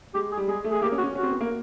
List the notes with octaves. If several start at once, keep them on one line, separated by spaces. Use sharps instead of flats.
G#3 G4
G#4
G3
G#3 G#4
A3
G#4
A#3 G4
C#4
F#4
C#4
C#4 F#4
C4
B3
A#3